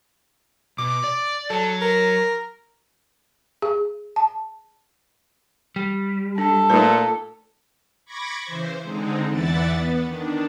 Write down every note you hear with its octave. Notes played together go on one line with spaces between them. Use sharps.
B2 D6
D5
F#3 A4
A#4
G#4
A5
G3 G5
D4 A4
A#2 A3 D#4 B4
B5 C#6 D6 G#6 A#6
C#3 E3 C5
D3 G#3 C4 D#4
E2 E3 D5 E5 F#5 A6
B3
D#3 D4